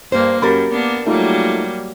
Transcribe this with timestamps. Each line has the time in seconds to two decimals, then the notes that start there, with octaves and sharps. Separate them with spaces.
0.12 G2 A#3 C5
0.42 F#2 G4 A#4 B5 A6
0.71 A#3 B3 D4
1.06 F#3 G3 A3 A#3 D#4 F4